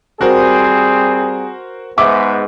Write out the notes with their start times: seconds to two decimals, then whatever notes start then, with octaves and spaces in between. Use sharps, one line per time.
0.21 G3 C4 F#4 G#4 A#4 C5
1.98 G#2 B3 E5 D6